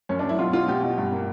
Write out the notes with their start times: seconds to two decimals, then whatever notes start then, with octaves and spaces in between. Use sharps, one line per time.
0.09 F#2 C#4
0.19 D4
0.24 F#2
0.29 E4
0.39 B2 F4
0.53 B2 F4
0.68 B2 G4
0.83 B2
0.97 G2
1.12 A#3